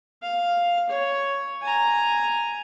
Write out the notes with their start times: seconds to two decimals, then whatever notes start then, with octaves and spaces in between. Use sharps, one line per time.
0.22 F5
0.89 C#5
1.62 G#5 A#5